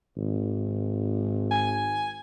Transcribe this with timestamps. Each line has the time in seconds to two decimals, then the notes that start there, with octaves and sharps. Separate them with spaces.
0.17 G#1
1.51 G#5